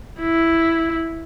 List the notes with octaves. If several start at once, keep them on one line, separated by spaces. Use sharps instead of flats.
E4